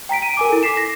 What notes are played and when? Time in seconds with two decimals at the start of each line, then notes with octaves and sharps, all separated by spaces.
0.09 G5 A#5 B6 D7
0.22 D#7
0.37 A#4 G#5 D6
0.49 E4 A4
0.63 D6 B6 C7 E7
0.77 A#6